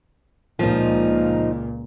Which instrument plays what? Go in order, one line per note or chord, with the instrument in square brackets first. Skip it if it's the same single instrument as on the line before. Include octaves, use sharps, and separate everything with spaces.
[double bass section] C#2 A#2 [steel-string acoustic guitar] F3 D#4